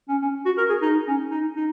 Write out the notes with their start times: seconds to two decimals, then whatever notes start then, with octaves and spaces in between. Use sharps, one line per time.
0.09 C#4
0.22 C#4
0.46 F#4
0.57 A#4
0.69 G#4
0.82 D#4
1.07 C#4
1.31 D#4
1.56 D#4